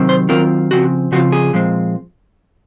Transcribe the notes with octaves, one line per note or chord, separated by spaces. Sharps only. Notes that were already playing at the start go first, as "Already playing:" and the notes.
Already playing: C3 D#3 F#3 C4
C5
D#3 F#3 C4 F4 A#4
C#3 F3 C4 F#4
C#3 F3 C4 F4 F#4
G#4
A#2 F3 G#3 C4